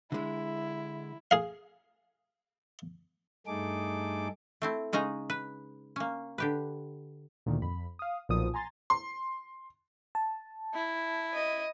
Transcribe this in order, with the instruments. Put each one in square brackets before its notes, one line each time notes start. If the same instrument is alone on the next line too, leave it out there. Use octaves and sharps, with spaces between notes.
[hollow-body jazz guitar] D3 G#3 [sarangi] E4
[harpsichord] G#4 F5
[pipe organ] G2 A3 D#4 G#4 A4 D6
[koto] A3 C4 E4
C#3 G#3 C#4 D#4 A#5
B4
A#3 C#4
D3 G4 B4
[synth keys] D2 A#2 D#3
F2 B5
F5 D#6
B1 A#2 F3 D#6
G#5 A#5 C6 A6
[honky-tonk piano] C6
[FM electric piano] A5
[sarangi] E4
[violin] D#5